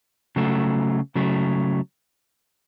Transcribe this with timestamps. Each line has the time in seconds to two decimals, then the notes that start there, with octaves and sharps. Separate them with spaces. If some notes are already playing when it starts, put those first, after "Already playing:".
0.36 C#3 F#3 A3
1.15 C#3 F#3 A3